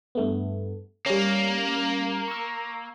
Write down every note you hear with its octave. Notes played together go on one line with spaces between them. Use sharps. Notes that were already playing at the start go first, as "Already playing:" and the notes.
G2 A3 B3
G3 A#3 C#4
C#6 E6